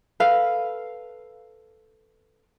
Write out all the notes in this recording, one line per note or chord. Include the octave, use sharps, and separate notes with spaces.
A4 B4 F5